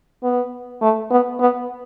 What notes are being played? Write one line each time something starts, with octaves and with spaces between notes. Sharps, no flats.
B3
A3
B3
B3